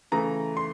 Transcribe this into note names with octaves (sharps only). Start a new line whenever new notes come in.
C#3 E3 A3 A#5
C6